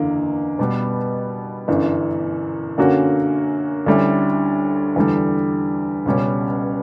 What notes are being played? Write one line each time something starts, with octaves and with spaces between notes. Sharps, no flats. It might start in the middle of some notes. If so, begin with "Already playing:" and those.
Already playing: F#1 E2 D3 A#3
B2 G3 B3
G1 F#2 E3
F#2 D3 A#3 C#4 F#4
D2 D3 G3 C#4 E4
E2 D3 G3
C#2 B2 G3 C#4